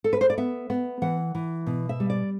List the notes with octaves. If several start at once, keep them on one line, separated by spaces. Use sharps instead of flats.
A4
B4
C5
D5
B3 E5
B3
E3 F#5
E3
B2
E5
G3
D5